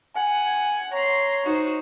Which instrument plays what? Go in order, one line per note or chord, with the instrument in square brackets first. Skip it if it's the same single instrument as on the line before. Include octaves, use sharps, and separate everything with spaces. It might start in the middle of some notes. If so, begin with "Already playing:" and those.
[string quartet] F#5 [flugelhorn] G#5
[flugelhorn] C#5 [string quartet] A#5 C6
[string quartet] D#4 F#4 C5